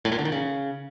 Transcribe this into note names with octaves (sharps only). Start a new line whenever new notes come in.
A2
A#2
D3
D#3
C#3